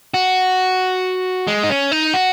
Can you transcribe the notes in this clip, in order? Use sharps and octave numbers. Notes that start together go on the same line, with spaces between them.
F#4
G#3
D#4
C#4
D#4
F#4